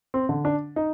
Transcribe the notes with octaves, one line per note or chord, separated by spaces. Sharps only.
C4
D3
D4
D#4